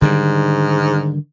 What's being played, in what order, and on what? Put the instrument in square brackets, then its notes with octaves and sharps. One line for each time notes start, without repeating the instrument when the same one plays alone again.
[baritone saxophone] G#2 [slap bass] D3 D#3 G3